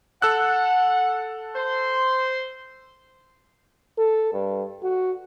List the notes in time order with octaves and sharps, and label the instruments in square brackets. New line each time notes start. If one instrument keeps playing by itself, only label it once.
[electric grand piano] A4 E6 F#6 [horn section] F#5
[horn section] C5 C6
[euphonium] A4
G2
F#4